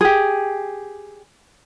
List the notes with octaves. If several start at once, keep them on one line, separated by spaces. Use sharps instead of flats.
G4 G#4